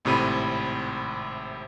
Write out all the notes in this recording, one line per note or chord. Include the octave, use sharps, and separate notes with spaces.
G#1 A2 C3 B5 D#7